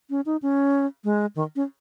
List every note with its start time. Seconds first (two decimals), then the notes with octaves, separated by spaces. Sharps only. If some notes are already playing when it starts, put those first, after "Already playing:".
0.10 C#4
0.26 D#4
0.42 C#4
1.04 G#3
1.36 D#3
1.56 C#4